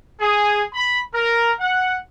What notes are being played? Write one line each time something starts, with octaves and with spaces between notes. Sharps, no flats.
G#4
B5
A#4
F#5